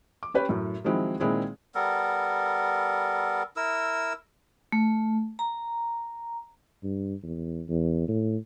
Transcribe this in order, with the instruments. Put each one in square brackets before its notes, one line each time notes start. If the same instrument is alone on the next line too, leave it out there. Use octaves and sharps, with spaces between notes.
[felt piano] D6
C#4 G4 B4 C#5 G5
F#2 A2
D#3 F3 F#3 G#3 C4 E4
A#2 D#3 G#3 C4 E4 G#4
[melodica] G3 B3 A4 A#4
E4 A#4 E6
[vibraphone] A3
A#5
[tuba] G2
E2
E2
A2